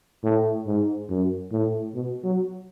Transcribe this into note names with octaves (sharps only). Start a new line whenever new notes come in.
A2
G#2
F#2
A2
B2
F#3